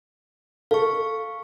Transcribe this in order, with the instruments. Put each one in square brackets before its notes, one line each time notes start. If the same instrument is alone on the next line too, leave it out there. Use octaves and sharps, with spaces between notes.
[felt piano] A4 [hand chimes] F5 C#6